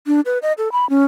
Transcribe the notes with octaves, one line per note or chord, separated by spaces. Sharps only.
D4
B4
D#5
A4
B5
C#4